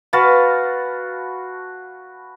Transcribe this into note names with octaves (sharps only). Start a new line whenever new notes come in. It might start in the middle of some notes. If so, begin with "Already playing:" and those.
F#4 B4 F5 A5